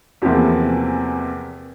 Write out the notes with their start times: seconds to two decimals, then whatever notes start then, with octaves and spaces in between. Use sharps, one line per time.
0.22 E2 C3 E3 F3 A#3